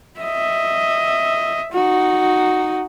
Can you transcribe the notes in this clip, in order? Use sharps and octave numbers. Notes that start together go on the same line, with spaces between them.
D#5 E5
D#4 F#4